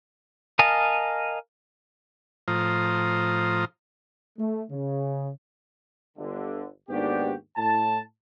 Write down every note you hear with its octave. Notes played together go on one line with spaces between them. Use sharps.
A#4 D#5 F5 G#5 A5
A2 F3 F4 C5 A#5 D#6
A3
C#3
G1 D3
D#2 G#2 B3 D4 F#4 G4
A2 A5